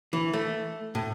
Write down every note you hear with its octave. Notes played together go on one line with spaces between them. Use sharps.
E3
A3
A2